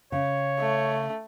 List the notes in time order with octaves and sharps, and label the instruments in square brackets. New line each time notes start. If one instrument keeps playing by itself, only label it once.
[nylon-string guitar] C#3 [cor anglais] C#5
[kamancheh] A3